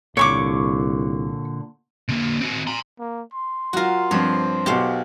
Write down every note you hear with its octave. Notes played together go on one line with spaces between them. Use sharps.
C2 A#2 D3 C#5 C#6 D6
D3 A#3
C4 F#4
A#5 C6
A#3
C6
F#3 F4 F#4 A#4
G2 F3 C4 C#5
B1 B2 G4 C5 F5